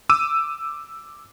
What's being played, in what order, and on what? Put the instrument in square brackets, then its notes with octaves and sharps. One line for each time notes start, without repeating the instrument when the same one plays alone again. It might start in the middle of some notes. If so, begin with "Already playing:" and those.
[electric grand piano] D6 E6 D#7